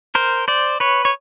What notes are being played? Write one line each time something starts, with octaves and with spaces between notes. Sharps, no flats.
A#4 C5
C5 D5
B4 C#5
C#5